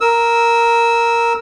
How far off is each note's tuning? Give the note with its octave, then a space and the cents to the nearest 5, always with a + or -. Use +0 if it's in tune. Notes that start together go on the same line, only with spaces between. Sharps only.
A#4 +0 E6 -15